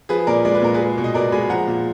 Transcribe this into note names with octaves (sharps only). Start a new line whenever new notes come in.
F3 G#4 B4
A#2 A#4 D5
G#3 D5
B4
A#2 A#4
G#4 B4
G#3
B2
D#5
B2 A#4 D5
G#3 G#5 B5
F3 F#5 A#5
A#2